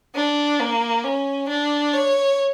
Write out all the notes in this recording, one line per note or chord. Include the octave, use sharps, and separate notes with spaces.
D4
A#3
C#4
D4
C#5